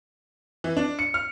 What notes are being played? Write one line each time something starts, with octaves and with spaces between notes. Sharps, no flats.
E3
D4
C#7
F6